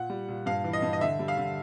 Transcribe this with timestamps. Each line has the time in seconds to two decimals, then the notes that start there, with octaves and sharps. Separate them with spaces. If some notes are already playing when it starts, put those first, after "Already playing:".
Already playing: A#2 F#5
0.10 G3
0.28 A#2
0.46 G2 F5
0.64 E3
0.73 D#5
0.82 G2
0.93 D#5
1.01 D3 E5
1.19 G3
1.28 F5
1.37 D3